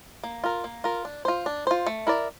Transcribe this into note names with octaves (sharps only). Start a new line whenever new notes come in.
A#3
F4 A#4
A#3
F4 A#4
D4
F4 C5
D4
F4 C5
A3
E4 A#4 D5